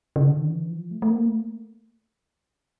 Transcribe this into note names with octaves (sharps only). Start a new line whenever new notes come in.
C#3
D3
D#3
E3
F3
A3
A3
A#3
A3